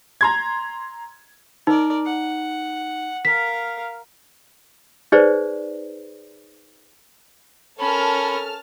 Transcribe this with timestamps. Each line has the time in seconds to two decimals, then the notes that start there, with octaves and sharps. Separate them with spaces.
0.21 A#5 C6 G#6
1.67 D#4 A#4 D5
2.06 F#5
3.25 A#4 F5 B6
5.12 D#4 G#4 B4 C5 D5
7.79 C#4 A4 A#4 A5 B5 F6